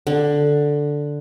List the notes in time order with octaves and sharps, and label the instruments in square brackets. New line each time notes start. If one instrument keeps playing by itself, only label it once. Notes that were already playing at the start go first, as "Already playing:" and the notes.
[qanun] D3